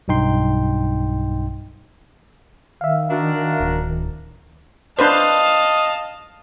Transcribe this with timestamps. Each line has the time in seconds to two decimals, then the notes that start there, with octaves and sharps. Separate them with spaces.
0.08 B1 G2 D#4 G5 C6
2.81 D#3 E5 F5
3.10 D4 F#4 A#4
3.60 D1
4.99 D4 B4 C5 D#5 F5 A5